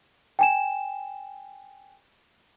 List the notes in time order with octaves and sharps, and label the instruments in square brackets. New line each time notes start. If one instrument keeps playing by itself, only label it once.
[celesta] G5 G#5 E7